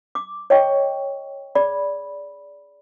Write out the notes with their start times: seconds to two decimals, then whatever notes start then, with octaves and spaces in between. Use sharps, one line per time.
0.15 D6
0.50 C#5 D#5 G5 C#6
1.55 G#4 D5 B5